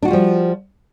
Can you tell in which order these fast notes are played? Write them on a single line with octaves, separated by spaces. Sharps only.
D4 F#4 F4 G3 F3